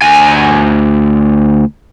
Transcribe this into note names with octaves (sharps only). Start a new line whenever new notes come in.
D2 G#5